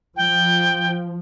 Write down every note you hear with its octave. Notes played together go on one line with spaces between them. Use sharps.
F3 G5